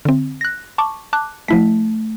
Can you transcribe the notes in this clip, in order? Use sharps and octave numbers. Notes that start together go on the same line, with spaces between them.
D3 C4
F#6 A#6
A5 C#6 D6
A5 D6 F#6
F3 A3 E4 B6